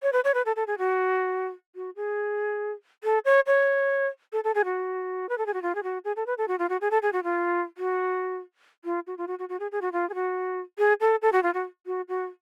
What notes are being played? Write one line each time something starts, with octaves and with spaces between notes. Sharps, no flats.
C#5
B4
C#5
B4
A4
A4
G#4
F#4
F#4
G#4
A4
C#5
C#5
A4
A4
G#4
F#4
B4
A4
G#4
F#4
F4
G#4
F#4
G#4
A4
B4
A4
F#4
F4
F#4
G#4
A4
G#4
F#4
F4
F#4
F4
F#4
F4
F#4
F#4
F#4
G#4
G#4
F#4
F4
G#4
F#4
G#4
A4
A4
F#4
F4
F#4
F#4
F#4